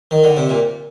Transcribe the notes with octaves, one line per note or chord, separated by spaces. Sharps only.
D#3
D3
C3
A#2